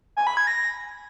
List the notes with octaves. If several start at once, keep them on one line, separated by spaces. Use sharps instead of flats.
G#5
B5
G#6
A#6